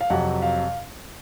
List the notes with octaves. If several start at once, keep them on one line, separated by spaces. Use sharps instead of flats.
F5
F2 C3 F#3 F#5
F5